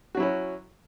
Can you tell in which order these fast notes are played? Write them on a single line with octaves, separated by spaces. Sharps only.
F#4 F#3 E4 C#4